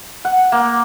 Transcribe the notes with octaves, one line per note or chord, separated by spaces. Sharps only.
F#5
A#3